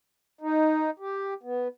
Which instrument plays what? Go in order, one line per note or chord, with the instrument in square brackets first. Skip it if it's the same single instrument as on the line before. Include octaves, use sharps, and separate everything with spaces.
[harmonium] D#4
G4
B3